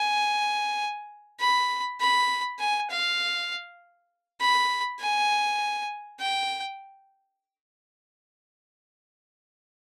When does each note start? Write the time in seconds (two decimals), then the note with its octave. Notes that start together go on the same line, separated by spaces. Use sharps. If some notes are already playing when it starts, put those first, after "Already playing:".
Already playing: G#5
1.40 B5
2.00 B5
2.59 G#5
2.90 F5
4.40 B5
5.00 G#5
6.20 G5